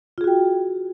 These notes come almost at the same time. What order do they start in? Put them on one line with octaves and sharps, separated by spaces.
F4 G#4 F#4 G5